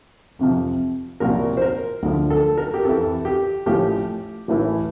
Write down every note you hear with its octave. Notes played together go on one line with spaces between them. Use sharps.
F2 C3 F3
C2 A#2 F3 A#4
C5
A#4
D2 D3 F3
A4
A#4
G4
F2 E3 A4
G4
A1 A2 F3 G4
A1 A2 E3